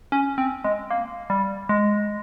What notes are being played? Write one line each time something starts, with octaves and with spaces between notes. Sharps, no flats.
C#4
C4
G#3
A#3
G3
G#3